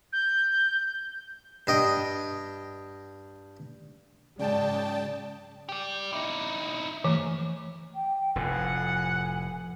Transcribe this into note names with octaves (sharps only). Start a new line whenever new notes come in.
G6
G2 D#5 G5
G#2 C#3 F#3 G#3 D5 G5 A5
G4 D5
D#4 E4
F#2 E3 A3
G5
F1 A2 F#5 G#5